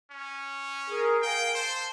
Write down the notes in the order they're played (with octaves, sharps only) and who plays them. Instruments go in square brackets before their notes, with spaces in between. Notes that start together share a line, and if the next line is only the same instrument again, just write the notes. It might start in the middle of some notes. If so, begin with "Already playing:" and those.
[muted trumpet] C#4
[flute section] G#4 A#4
[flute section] A#4 F5 G#5 [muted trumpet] G5
[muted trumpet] C5 [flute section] A5